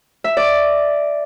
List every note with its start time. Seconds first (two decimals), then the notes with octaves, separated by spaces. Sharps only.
0.24 E5
0.37 D5